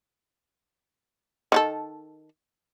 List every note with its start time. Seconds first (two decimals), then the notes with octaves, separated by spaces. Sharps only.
1.52 D#3 F#4 A4